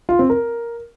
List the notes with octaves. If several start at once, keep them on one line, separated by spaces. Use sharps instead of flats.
F4
C4
A#4